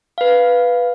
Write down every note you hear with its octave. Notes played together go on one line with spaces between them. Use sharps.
B4 F5